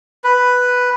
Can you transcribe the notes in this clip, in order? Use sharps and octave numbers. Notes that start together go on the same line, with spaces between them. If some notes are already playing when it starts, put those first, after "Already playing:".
B4